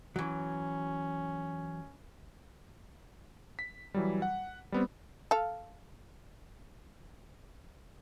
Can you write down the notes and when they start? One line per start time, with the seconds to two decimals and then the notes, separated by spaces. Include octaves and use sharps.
0.16 E3 F#3 C#4
3.59 B6
3.94 E3 F#3 G3
4.22 F#5
4.72 G3 B3 C4
5.31 A4 F5